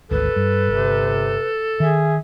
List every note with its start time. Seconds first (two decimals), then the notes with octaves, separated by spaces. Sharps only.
0.11 G#1 D2 A4 B4
0.36 G2
0.68 G1 C3
1.80 D#3 G#4 E5